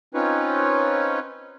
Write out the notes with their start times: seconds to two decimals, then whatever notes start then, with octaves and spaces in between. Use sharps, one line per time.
0.14 C4 C#4 D#4 F4 B4 C#5